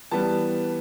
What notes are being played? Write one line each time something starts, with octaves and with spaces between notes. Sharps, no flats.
E3 G3 B3 A5